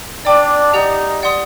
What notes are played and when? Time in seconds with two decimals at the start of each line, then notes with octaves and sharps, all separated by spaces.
0.25 D4 D5 G5 D6
0.74 D#4 G4 D5 F#5
1.22 D5 F#5 C6 D#6